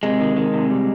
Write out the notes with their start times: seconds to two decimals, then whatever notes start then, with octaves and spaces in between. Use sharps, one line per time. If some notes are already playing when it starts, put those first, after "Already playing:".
0.03 C3 G#3
0.20 D#3
0.37 D#3
0.54 C3
0.70 G3